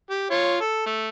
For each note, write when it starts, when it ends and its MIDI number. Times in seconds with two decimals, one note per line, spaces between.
0.10 0.28 67
0.31 0.57 65
0.31 0.57 73
0.61 0.86 69
0.86 1.09 57